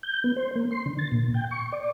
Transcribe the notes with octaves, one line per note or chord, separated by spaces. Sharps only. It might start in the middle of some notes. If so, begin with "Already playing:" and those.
G6
B3
C5
A#3
C6
D3
A6
A#2
G5
C#6
D5